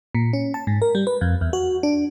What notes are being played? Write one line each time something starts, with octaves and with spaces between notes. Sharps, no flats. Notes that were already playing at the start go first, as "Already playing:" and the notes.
A#2
C#4
A5
G#2
A#4
G3
B4
F2
E2
F#4
D4